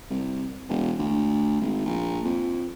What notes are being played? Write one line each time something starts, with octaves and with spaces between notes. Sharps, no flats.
C2
E1
D2
G#1
A#1
F2